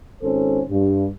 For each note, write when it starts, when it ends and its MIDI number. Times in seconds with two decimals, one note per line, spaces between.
0.22 0.60 32
0.22 0.60 61
0.22 0.60 69
0.22 0.60 72
0.70 1.06 43